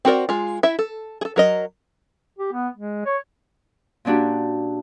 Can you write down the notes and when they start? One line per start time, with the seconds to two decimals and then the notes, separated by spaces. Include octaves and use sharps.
0.05 C4 F#4 A#4 D5
0.29 G#3 F4
0.63 E4 E5
0.79 A4
1.21 G#4 A4
1.36 F#3 A#4 D#5
2.39 G4
2.53 B3
2.77 G#3
3.06 C#5
4.05 A#2 C#4 D4 F#4 G4